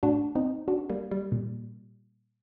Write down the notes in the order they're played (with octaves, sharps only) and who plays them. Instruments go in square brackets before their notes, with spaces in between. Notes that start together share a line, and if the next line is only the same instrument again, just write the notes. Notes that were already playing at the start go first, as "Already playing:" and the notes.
[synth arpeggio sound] A2 D4 F#4
C4 D#4
D4 F#4
G3 A#3
G3
A#2